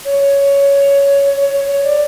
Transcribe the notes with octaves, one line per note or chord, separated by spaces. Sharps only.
C#5
C#5
C#5
C#5
D5